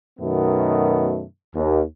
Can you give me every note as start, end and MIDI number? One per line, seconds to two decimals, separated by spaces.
0.20 1.24 42
0.20 1.24 47
0.20 1.24 51
0.20 1.24 57
0.20 1.24 59
1.55 1.81 39